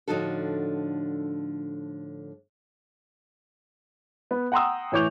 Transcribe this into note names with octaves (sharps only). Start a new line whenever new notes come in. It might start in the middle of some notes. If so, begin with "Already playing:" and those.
A2 D3 F3 D#4 F#4 A4
B3
F#5 G5 A#5 C6 D#6 E6
A2 E3 C#5 D6 G6 F7